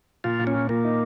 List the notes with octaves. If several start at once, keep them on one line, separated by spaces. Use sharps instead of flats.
A#2 F4
A#2
C#4
A#2
A#2 A#3
D#4